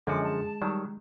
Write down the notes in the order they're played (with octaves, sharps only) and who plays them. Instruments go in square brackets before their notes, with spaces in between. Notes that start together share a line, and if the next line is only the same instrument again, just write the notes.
[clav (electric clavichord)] F#2 F3 F#4 [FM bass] D3 [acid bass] G#3 [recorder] D6
[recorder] A5
[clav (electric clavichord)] D#3 F#3 [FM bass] G3